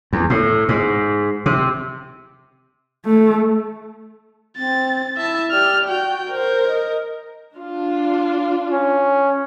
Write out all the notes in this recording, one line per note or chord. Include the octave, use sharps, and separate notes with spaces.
E2
A2
G#2
C3
A3
C4 A6
E4 E5 A5
G4 D5 F6
F#4 G5
A#4 C5
D#5
D4 F4
C#4